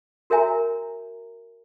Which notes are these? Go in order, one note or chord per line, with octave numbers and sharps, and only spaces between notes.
F#4 A#4 C#5 E5 G#5 A#5